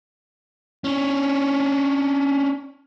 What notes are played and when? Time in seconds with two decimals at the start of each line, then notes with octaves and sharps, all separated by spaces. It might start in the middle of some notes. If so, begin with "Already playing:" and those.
0.84 C#4 D4